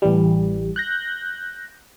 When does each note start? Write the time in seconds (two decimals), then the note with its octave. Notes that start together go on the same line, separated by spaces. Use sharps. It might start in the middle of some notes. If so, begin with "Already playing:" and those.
0.02 A1 E3 G3
0.76 F#6 G6 A#6